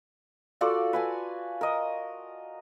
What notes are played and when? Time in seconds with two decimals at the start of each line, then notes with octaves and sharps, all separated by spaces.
0.61 F4 F#4 A4 D5
0.93 B4 G#5 A5
1.61 A#4 D#5